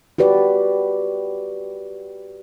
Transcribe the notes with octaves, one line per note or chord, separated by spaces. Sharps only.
F#4 G4 B4 D5